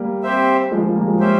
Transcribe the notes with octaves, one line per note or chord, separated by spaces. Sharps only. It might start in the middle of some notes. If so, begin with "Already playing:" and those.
Already playing: G3 A#3
C4 G4 C5 E5
F3 G#3
F3 G#3
G3 A#3
F3 G#3
C#4 G4 C5 E5